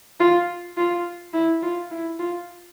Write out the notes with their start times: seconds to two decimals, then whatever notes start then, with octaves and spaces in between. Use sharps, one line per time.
0.20 F4
0.77 F4
1.34 E4
1.62 F4
1.91 E4
2.19 F4